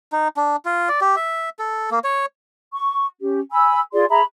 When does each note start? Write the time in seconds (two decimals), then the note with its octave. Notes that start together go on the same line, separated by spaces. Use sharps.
0.12 D#4
0.37 D4
0.65 F4
0.89 D5
1.01 G4
1.16 E5
1.59 A4
1.91 A#3
2.04 C#5
2.74 C#6
3.21 C#4 G4
3.52 G#5 B5 E6
3.93 F4 G#4 D5 C6
4.09 G#4 E5 A#5 B5